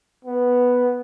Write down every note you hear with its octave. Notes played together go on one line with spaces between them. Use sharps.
B3